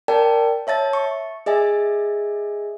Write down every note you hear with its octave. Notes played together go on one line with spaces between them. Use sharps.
A#4 D5 G5 A5
C#5 E5 A5 A6
C#6
G#4 D#5 E5 G#5